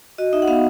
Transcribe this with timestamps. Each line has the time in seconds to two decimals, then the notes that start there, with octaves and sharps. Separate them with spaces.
0.18 F#4 D#5
0.33 D#4 E5
0.42 F#5
0.47 B3 F5